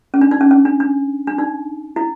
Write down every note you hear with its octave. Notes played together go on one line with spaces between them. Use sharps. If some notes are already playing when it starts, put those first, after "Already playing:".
C#4
D4
D#4
C#4
C#4
D4
D4
D4
D#4
E4